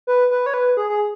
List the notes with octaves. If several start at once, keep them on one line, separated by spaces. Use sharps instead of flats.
B4
B4
C#5
B4
G#4
G#4